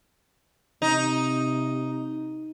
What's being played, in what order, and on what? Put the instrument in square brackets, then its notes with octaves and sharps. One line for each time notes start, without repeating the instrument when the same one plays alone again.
[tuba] C3 [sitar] D#4